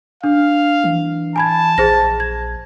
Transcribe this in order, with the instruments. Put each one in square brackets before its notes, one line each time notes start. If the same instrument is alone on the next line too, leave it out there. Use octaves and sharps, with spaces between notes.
[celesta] D4 [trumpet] F5
[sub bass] E3
[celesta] G#5 B5 G#6 [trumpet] A5
[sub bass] A#1 [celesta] G#4 C5 A#6
[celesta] G#6